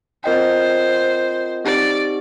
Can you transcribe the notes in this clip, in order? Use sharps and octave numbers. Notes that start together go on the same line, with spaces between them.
C4 F4 A#4 C5 D#5 G5
C4 D#4 G4 D5